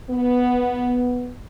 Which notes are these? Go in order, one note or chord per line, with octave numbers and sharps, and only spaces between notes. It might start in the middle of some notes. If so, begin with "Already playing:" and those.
B3